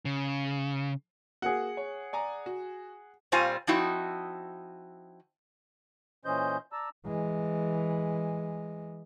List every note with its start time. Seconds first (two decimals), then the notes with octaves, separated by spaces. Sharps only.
0.05 C#3
1.42 A#3 F#4 G#4 F#5
1.77 C#5
2.13 D5 G#5 A#5
2.46 F#4
3.32 A#2 G3 C4 F4 C5 G#5
3.67 F3 C4 D#4 E4 F#4
6.25 A#2 E3 C#4 C5 D#5 G6
6.72 D5 A5 A#5 E6
7.06 E3 G#3